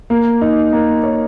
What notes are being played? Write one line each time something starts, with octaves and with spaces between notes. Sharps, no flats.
A#3
D#4
A#3
C#5